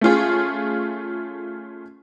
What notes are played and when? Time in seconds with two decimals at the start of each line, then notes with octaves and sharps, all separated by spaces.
0.01 A3 C#4 F4 G#4